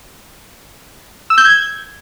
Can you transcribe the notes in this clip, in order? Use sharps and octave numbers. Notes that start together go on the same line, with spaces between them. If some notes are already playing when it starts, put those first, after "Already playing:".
E6
G6
G#6